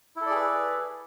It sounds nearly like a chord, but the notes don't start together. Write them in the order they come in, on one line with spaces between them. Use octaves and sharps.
E4 A4 D5 G#4 B4